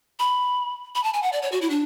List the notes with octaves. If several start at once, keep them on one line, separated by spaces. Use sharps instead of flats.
B5
B5
A5
G#5
F#5
D5
C#5
F#4
E4
D4